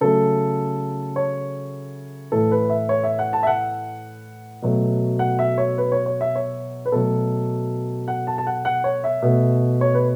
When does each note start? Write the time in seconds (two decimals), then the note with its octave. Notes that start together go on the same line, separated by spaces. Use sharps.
0.01 C#3 F#3 A3 A4
1.16 C#5
2.32 A2 E3 A3 A4
2.52 B4
2.70 E5
2.89 C#5
3.04 E5
3.19 F#5
3.33 A5
3.43 E5
3.47 F#5
4.62 B2 F#3 A3
5.19 F#5
5.39 E5
5.58 C#5
5.78 B4
5.92 C#5
6.06 C#5
6.21 E5
6.36 C#5
6.86 B4
6.92 B2 F#3 A3 A4
8.08 F#5
8.27 A5
8.38 A5
8.47 F#5
8.65 F#5
8.84 C#5
9.04 E5
9.22 B2 A3
9.81 C#5
9.95 B4